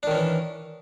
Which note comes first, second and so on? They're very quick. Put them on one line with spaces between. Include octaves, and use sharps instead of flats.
D4 D#3 C#4 E3